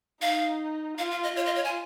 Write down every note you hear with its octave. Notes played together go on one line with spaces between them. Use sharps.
D#4 F5
F4 F5
F5
D#5
F4 C#5
D#5
C#5
G#5